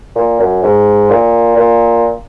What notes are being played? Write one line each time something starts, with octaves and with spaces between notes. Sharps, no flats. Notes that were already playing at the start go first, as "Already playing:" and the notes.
A#2
F#2
G#2
A#2
A#2